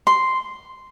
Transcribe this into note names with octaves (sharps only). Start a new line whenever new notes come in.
C6